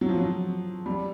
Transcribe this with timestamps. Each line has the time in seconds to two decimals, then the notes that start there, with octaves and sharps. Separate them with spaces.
0.01 F#3
0.09 F3
0.18 F#3
0.86 G3